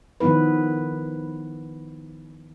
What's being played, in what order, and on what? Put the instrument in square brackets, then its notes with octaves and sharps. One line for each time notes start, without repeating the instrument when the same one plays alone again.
[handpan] D#3 F3 B3 E4 B4